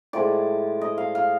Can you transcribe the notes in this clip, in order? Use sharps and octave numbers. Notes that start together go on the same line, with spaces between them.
A2 F3 G#3 D5
D#5
F5
F5